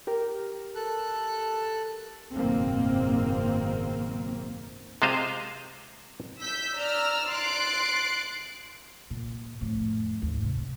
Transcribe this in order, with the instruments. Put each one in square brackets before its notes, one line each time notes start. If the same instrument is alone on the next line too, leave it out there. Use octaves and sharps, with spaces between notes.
[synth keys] G4 A#4
[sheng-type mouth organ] A4 F#6
[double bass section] F#1 B1 G#2 D#3 A#3 C4
[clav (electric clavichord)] C3 G#3 F4 C5 D#5 F5
[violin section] E6 G6 B6
D5 A#5 E6 F6
C6 F#6 A6 C7 D7
[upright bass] A#2
F2 A2
D#2 G#2
C3